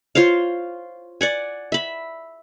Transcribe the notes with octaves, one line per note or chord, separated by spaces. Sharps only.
F4 C5 C#5 F5
D5 F#5 G#5
E5 B5